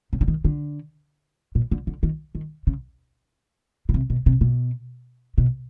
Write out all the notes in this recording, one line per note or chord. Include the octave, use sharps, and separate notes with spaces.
C#3
D3
D#3
D3
A#2
D3
D3
D#3
D#3
C#3
B2
C3
B2
C3
B2
B2